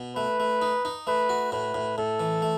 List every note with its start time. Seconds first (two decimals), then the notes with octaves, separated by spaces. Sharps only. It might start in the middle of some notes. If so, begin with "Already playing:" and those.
Already playing: B2
0.16 A3 B4
0.40 A3
0.62 D#4
0.85 D#4
1.07 A3 B4
1.29 F#4
1.52 A2 B4
1.74 A2
1.98 A2 A4
2.20 E3
2.42 A3